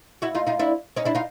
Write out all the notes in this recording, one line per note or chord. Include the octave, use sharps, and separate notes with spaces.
E4 F#4
D#4 F4
D#4 F4
D4 E4
C#4 D#4
D4 E4
D#4 F4